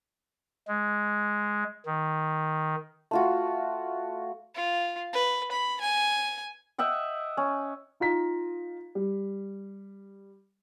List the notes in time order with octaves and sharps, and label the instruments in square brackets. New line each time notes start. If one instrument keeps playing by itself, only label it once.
[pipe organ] G#3
D#3
[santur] A3 F4 F#4
[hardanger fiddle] F4
B4
B5
G#5
[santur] D#5 E5 F#5 G5
C#4
[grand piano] D#4 F4 A#5 B6
G3